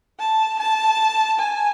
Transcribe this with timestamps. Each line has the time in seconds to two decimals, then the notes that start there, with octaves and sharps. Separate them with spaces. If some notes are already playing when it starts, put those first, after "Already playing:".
0.19 A5
0.59 A5
1.39 G#5